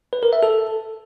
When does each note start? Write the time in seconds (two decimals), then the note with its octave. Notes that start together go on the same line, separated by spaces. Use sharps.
0.13 B4
0.23 A#4
0.33 E5
0.43 A4